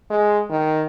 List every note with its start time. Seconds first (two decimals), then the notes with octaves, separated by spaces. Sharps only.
0.10 G#3
0.50 D#3